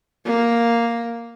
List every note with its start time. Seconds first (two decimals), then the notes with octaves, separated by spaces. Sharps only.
0.25 A#3